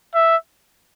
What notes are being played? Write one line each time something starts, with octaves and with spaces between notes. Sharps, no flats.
E5